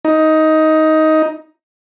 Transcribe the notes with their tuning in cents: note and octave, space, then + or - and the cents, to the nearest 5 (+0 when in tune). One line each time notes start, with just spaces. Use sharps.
D#4 +10